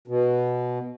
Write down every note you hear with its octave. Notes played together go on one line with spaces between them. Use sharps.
B2